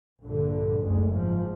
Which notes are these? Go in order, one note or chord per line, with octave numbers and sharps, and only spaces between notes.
A#1 G2 D3
F#1 D2 G#3
G#2 F3